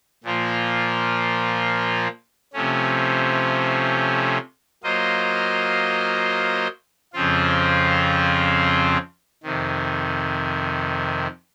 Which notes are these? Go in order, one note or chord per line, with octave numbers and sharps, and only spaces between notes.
A#2 F3 A#3 F4
C3 F3 A3 C#4
F#3 A#3 F4 C5 D#5
F2 C#3 F3 C4 F4
F2 C3 D#3